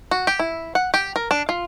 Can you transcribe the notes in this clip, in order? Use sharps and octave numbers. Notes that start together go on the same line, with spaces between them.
F#4
G4
E4
F#5
G4
A#4
D4
F4